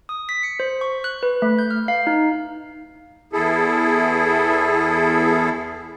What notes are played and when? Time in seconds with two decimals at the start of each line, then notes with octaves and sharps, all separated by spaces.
0.09 D#6
0.29 B6
0.43 C#7
0.60 C5
0.81 C#6
1.04 F#6
1.23 B4
1.42 A3
1.59 G6
1.71 F6
1.88 F5
2.07 D#4
3.33 E2 E4 G#4 A4